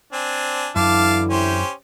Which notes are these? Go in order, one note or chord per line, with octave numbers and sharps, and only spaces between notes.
C4 D4 G#5
F#2 D3 E3 F#3 E4 F5 A5 D6
C#4 G4 C5